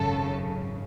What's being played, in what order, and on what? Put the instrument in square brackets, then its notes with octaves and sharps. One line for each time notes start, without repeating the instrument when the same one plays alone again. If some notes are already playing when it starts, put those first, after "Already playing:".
Already playing: [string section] G#1 F#2 C#3 A4